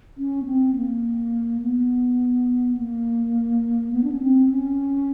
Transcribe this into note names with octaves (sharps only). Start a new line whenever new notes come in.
C#4
B3
C4
A#3
B3
A#3
B3
D4
C#4
C4
C#4